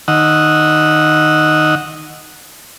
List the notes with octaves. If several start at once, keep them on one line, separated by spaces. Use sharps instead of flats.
D#3 D#5 F#5 E6